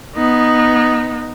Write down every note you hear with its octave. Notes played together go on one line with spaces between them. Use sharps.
B3 D#4